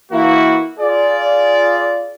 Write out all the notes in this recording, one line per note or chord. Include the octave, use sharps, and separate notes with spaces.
E3 A#3 E4 F#4
F4 G#4 D5